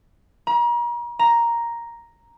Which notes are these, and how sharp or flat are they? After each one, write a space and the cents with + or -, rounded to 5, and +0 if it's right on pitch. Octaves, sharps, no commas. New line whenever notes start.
A#5 +40
A#5 +5